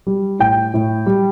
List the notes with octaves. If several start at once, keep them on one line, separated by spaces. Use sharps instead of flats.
G3
A2 G5
A2
G3